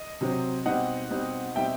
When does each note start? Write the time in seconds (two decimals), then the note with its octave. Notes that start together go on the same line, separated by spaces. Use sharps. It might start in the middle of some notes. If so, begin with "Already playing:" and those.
Already playing: D#5
0.21 C3 F#3 C4
0.66 B2 G3 C4 D#4 D#5 F#5
1.10 B2 G3 C4 D#4
1.56 B2 G3 C4 D#4 E5 G5